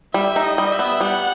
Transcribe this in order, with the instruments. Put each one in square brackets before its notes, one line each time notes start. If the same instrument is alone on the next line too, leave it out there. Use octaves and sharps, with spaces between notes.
[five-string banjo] G3 [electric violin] E5
[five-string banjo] D#4
[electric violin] D#5
[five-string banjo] G3
[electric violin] E5
[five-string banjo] B3
[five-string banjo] G3 [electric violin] F#5